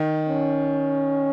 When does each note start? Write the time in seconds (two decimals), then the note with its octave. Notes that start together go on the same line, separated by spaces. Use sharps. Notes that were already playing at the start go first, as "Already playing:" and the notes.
Already playing: D#3
0.29 C#4